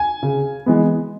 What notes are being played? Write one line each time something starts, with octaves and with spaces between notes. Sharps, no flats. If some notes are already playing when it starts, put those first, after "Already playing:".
Already playing: G#5
C#3
E3 G#3 B3